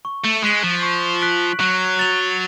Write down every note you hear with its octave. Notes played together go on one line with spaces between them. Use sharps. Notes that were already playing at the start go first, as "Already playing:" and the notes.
C#6
A3
G#3 F#6 B6 D7 F#7
F3
C#6
F#6 B6 D7 F#7
F#3 F#6
A6 F7